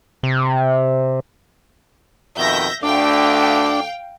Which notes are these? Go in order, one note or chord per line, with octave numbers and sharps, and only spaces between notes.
C3
F2 B2 D#3 E5 G6 A#6
D2 D3 A3 D4 F5 G5